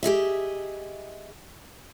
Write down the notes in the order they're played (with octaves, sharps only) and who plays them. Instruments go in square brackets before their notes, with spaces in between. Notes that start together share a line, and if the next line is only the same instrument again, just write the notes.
[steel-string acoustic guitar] G4 G#4 D#5 E5